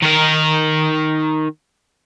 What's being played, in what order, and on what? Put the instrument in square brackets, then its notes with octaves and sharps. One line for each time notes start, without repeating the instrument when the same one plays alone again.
[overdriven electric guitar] D#3 A#4